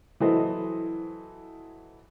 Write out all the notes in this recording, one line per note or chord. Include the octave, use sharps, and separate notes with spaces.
E3 F#3 E4 A4 C5 D#5